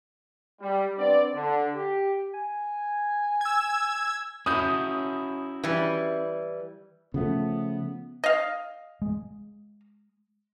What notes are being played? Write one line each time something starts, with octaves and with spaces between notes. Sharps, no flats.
G3
B3 C4 D4 D5
D3
G4
G#5
E6 G#6
C#4 E4 F#4 D#6 G6
E3 G3
C#3 F3 A3 B3
D#5 F5
G#3